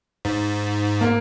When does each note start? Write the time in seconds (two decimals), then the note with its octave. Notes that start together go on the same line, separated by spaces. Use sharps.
0.25 G#2
1.01 A#3